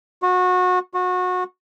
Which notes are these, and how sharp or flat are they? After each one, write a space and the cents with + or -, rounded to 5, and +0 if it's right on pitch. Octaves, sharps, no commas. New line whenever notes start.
F#4 -25
F#4 -25